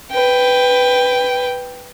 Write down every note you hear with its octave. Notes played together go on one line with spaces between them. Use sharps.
B4 G5